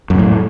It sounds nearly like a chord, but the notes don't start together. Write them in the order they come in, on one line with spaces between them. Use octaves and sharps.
F#2 C3 A2